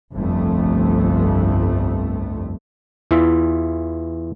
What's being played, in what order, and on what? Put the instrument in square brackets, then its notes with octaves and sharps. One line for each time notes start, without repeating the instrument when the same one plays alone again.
[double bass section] G1 C2 F2 A3
[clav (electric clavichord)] E2 E3 F4 E5